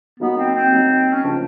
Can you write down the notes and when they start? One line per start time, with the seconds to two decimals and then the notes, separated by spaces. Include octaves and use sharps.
0.20 F#3 A#3 B3 D#4 F#4
0.38 C4
0.55 C4
0.72 F#3 A#3 D#4 F#4
1.13 C#4
1.24 C#3 F3 A#3 D4